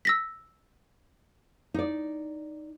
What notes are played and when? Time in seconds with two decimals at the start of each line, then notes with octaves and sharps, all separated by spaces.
0.05 E6 A#6 B6
1.74 D#4 D5